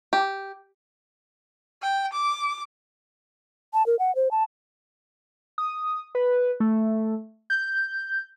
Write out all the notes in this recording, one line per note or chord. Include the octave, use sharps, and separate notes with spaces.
G4
G5
D6
A5
A#4
F#5
C5
A5
D#6
B4
A3
G6